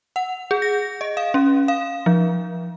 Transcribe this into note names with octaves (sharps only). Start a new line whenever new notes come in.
F#5
G#4
A#6
D#5
F5
C#4
F5
F3